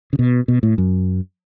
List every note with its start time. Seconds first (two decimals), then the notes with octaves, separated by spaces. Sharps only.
0.13 C#3
0.19 B2
0.48 B2
0.63 A2
0.78 F#2